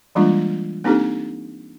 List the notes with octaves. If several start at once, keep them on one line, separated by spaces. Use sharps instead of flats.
E3 G3 G#3 A#3 D4 F4
A#3 C4 D4 D#4 G4 A4